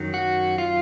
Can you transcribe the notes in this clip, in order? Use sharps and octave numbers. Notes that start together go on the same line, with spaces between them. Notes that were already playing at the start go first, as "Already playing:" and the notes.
Already playing: F#2 D#3 F#3
F#4
F4